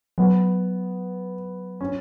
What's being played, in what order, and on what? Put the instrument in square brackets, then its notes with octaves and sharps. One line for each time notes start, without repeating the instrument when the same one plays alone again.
[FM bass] F#3 [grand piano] B3
[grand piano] C#4